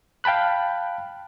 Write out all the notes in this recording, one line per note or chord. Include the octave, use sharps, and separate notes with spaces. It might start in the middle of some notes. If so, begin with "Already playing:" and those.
F5 G5 A5 B5 F#6